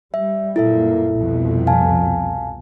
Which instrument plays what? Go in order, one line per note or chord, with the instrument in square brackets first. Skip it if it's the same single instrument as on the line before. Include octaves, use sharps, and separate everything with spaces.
[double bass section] G3 [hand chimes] E5
[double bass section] F#2 A#2 A#3 [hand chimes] E4 A4 E5
[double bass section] C2 F2 B2
[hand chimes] F5 G#5 A5